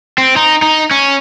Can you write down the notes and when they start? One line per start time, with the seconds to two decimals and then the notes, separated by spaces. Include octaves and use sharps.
0.18 C4
0.36 D#4
0.62 D#4
0.91 C#4